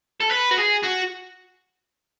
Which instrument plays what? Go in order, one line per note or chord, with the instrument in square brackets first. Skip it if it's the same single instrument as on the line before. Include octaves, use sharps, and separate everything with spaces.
[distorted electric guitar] A4
B4
F#4
G#4
F#4